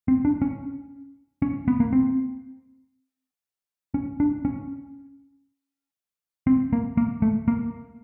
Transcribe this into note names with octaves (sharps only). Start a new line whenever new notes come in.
C4
D4
C#4
C#4
B3
A#3
C4
C#4
D4
C#4
C4
A#3
A#3
A3
A#3